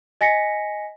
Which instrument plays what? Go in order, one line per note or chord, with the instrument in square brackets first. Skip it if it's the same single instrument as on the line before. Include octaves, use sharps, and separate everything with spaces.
[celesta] D#5 G#5 A#6 B6 C#7